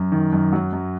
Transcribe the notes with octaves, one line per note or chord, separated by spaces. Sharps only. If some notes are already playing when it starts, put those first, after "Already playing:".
Already playing: F#2
D#3
F#2
F#3
F#2